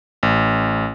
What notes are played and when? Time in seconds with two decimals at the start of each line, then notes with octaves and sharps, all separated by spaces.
0.23 A1